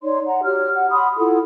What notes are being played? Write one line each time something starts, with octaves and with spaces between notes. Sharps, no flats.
D#4 C#5 D5 C6
F#5 A#5
F#4 G4 C#5 F6
F#5
F#5 B5 C6 D#6
E4 F4 A4 F#5